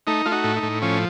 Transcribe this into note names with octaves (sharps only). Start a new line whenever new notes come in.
A3 D#4
A3 F4
D#4 F#4
A2
D#4
A2
F3 C#4